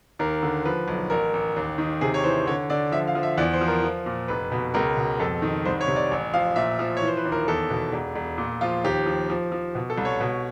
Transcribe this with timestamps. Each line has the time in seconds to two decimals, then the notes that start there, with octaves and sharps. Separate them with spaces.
0.19 D#2 A#4
0.43 D3
0.65 F3 B4
0.88 B1
1.10 A1 A#4
1.33 A1
1.56 D#2
1.78 D#3
2.01 C3 G#4
2.14 C#5
2.24 E3 C5
2.47 D3 C#5
2.70 D3 D5
2.92 F3 E5
3.07 F5
3.15 F3
3.23 E5
3.37 E2 D5
3.53 C5
3.61 F3
3.68 A#4
3.83 F3
4.06 A#2
4.28 F1 B4
4.52 B2
4.74 C#2 A#4
4.97 B2
5.19 F2 A4
5.42 D#3
5.65 C2 C5
5.81 C#5
5.88 C3
5.96 D5
6.11 A1
6.33 F3 F5
6.56 A#2 E5
6.79 F3
6.97 E3 C#5
7.08 C5
7.17 B4
7.25 D#2
7.32 A#4
7.48 E2 A4
7.70 B2
7.92 E1
8.16 E1
8.38 A#2
8.61 F3 F4
8.84 D#2 G4
9.06 F3
9.30 F3
9.52 F3
9.75 B2
9.90 A4
9.98 C2
10.05 C#5
10.20 B2